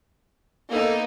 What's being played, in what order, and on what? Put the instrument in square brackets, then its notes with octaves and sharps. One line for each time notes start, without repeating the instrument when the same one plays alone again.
[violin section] A#3 B3 D#4 [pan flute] A4